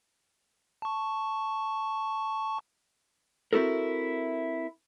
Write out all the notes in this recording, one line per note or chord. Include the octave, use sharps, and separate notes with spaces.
A5 C#6
C4 E4 F#4 A4 A#4